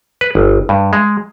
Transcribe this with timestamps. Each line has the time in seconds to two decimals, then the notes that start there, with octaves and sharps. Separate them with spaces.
0.21 B4
0.35 G1
0.69 G2
0.93 G#3